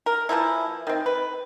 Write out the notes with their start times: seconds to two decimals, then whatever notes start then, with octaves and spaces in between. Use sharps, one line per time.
0.06 A#4
0.29 E3 F3 A#3 E4
0.87 D#3 C4
1.06 B4